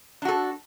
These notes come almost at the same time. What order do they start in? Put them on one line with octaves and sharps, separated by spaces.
D4 F#4 A4